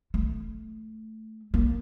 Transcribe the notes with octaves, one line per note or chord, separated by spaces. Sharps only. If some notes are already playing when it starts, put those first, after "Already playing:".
A3
A#3